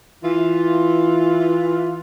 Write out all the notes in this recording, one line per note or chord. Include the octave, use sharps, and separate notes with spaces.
E3 F4